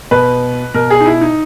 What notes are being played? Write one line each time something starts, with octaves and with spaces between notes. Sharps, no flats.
B2 B4
B2 A#4
G#4
D#4
E4
D#4